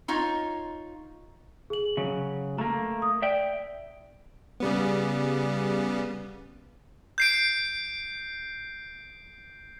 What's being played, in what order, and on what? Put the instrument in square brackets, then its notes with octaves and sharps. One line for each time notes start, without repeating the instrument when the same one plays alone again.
[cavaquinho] D#4 F4 C#5
[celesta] G#4 F#7
[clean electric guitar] C#3 F#3
[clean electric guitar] A3 A#3 [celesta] A#5
[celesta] D#6
[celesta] D5 [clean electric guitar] E5 G5
[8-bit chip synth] C#3 G3 B3
[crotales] G6 C7 D7